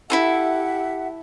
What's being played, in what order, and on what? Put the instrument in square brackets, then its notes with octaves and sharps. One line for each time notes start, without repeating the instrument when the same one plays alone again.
[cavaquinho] E4 F4 A4 [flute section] G4 E5 F#5